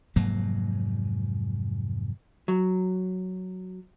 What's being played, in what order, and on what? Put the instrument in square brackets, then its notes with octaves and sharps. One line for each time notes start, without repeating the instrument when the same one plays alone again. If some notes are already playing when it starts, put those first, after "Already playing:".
[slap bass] F1 G#2 F#3 A#3
[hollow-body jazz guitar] F#3